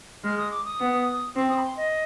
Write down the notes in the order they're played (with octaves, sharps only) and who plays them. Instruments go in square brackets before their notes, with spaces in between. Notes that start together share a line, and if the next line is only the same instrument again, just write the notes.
[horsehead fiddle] G#3 [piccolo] F6
[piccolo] D#6
D6
D#6
[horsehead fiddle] B3
C4
[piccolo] D#6
B5
C6
D#5